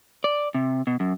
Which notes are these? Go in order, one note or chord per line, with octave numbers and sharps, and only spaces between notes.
D5
C3
B2
F#2